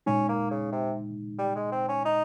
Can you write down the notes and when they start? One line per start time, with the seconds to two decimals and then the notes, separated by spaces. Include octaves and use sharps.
0.06 A#2 G#3 C#4 D#4
0.29 A#3
0.51 C#3
0.72 C3
1.38 G3
1.55 G#3
1.72 C4
1.88 C#4
2.05 D#4